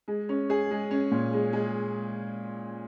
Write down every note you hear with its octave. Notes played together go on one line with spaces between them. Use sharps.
G#3
C#4
G#4
G#3
C#4
A#2
G#3
G#3